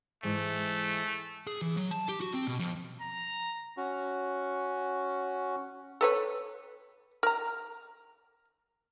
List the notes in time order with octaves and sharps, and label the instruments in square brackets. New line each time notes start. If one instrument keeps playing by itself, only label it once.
[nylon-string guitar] G#2 E3 G#3 [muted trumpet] A3
[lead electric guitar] G#4
E3
F#3
A5
G4
F#4
C4
B2
F2
[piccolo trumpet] A#5
[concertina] C#4 F#4
[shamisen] A4 B4 C#5
A#4 A#5